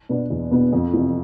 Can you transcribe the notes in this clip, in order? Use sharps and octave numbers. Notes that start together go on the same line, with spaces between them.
B2 B3 D4
E2
B2 B3 D4
F2
C3 E3